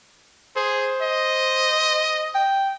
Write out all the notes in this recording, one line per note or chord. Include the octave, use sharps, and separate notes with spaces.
G#4 C5
D#5
G5